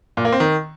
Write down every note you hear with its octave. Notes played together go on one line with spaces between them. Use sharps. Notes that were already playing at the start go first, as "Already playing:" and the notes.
A#2
A#3
C4
D#3